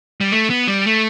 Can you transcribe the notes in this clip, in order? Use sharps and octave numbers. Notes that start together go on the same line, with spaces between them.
G3
A3
B3
G3
A3